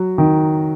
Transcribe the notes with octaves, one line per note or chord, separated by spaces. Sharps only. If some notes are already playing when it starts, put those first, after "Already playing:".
Already playing: F#3
D#3